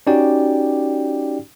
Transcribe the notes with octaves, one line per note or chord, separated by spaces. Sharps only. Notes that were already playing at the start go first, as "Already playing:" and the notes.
C#4 D#4 F#4 G4 D5 G5